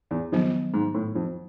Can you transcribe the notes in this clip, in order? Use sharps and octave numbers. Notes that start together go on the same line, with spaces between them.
E2
F2 D#3 F#3 B3
G#2
A2
F2